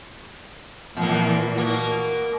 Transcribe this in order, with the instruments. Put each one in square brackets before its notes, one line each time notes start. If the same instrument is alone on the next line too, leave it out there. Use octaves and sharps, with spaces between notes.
[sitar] E2 A#3 [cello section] A#2 E3
[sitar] B2 A#3